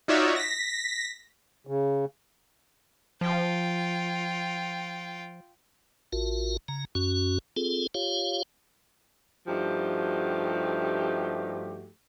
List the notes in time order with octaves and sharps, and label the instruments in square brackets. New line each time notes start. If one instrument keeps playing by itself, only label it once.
[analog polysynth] D#4 F4 F#4 C#5 D5 E5
A#6 B6
[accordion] C#3
[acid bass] F3 [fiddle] F4 G5
[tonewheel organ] A1 F4 F#4 A#4
C#3 A#5
F#2 C#4 F#4
C4 F4 G#4 A4
F4 G4 C#5 F5
[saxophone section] G2 F3 A3 D#4 F#4 G4